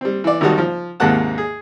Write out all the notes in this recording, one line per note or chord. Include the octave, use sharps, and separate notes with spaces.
G3 C4
E3 D5
G#1 D#3 G3 D#4 F#4 A5
F3
D#2 G#2 C3 A#3 F#5 A5
G#4